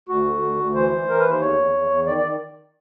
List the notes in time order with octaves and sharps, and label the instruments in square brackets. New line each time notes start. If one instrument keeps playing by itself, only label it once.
[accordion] D2 F#4
D3
D2
D2
E3 C5
E3
E3 A#4
D#2 B4
C5
E2 C#5
E2
E2
E2
D#3 D5
D5
D#3